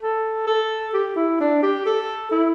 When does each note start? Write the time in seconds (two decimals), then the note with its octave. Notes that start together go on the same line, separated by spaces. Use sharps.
0.01 A4
0.47 A4
0.94 G4
1.16 E4
1.40 D4
1.63 G4
1.86 A4
2.31 E4